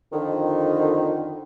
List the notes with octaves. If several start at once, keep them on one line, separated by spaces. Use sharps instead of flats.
F2 D3 D#3